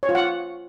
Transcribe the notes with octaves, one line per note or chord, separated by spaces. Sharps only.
C#5
F4
F#5